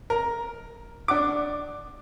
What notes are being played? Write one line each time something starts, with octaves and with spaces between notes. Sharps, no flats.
A#4
D4 F#5 D6